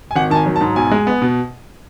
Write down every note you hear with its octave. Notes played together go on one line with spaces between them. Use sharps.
G#5
G#1 F#5
D#3 G#5 A5
F#3
A5
G#2
B1 G#5
G#3
B3
B2